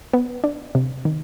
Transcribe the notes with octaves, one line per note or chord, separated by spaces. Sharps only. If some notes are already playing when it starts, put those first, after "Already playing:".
B3
D4
C3
D#3